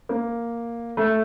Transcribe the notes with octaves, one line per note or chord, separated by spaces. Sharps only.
A#3
A3